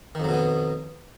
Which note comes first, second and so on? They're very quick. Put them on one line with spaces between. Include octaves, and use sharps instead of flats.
D#3 F2 F#3 B2 B3